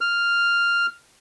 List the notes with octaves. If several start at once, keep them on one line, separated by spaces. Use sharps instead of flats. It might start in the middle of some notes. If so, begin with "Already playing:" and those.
F6